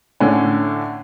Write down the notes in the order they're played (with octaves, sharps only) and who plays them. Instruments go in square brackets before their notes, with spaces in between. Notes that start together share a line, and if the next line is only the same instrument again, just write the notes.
[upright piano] A2 D3 C#4